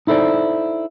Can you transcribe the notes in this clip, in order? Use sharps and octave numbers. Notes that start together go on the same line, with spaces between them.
D#4 E4 A4 C5 D5